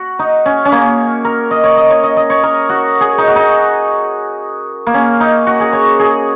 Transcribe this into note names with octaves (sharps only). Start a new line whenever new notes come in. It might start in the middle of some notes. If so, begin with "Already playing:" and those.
Already playing: F#4
D#4
C#4
C#4
A#3
A#4
D#5
C#5
D#5
C#5
D#5
D#5
C#5
A#4
F#4
G#4
D#4
F#4
D#4
A#3
C#4
D#4
F#4
G#4
C#5
G#4